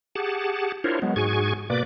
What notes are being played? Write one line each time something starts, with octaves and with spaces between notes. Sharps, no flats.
G4 G#4 F#5 A5
D4 E4 F4 A#4 C5 C#5
F#3 G#3 B3
G#2 F#4 G#4 G#5 C#6
B2 A#3 B4 D5 D6